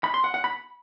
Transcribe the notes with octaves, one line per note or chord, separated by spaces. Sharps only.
B5
C6
F#5
F#5
B5